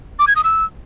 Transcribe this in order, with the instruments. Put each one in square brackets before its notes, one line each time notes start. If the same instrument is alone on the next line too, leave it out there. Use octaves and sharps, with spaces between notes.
[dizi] D6
G#6
D#6
E6